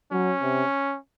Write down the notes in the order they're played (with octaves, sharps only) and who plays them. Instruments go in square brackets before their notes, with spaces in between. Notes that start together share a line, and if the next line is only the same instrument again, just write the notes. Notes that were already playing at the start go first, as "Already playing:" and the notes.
[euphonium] F#3 [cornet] C#4
[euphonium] C3